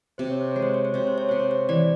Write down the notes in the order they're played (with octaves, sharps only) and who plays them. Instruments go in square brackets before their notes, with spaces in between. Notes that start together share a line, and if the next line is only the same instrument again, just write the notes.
[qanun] C3 [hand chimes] C5
[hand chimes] C#5
C5
[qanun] G#3 [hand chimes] C#5
[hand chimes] C5
C#5
C5
[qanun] C3 [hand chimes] C#5
[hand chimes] C5
C#5
[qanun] C3 [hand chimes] C5
[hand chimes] C#5
C5
[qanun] E3 [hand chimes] D5